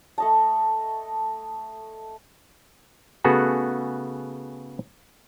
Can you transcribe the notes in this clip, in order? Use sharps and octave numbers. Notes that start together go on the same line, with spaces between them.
A3 D#5 A5
C#3 A3 B3 F#4 G#4 A4